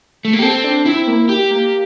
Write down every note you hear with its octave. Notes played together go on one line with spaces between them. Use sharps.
A3
A#3
G4
C4 A4
D4
C4 E4
A#3
G4
A#3